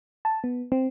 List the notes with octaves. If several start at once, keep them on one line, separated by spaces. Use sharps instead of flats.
A5
B3
C4